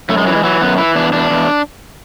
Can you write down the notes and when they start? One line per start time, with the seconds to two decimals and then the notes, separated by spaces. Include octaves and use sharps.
0.09 F#2 A3
0.18 G#3
0.27 E3 F#3
0.36 G#3
0.44 E3 F#3
0.61 F#2 B3
0.78 E3 E4
0.96 E2 D4
1.13 E2 D4
1.30 E2